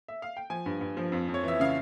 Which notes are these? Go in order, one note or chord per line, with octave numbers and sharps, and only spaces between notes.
E5
F5
G5
F3 G#5
G2
G2
F3
F2
F2
C#5
E3 E5
C#3 F5